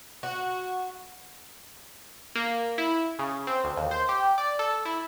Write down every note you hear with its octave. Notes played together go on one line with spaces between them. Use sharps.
F#4
A#3
E4
C#3
C4
D2
D#2
C5
G4
D5
A4
E4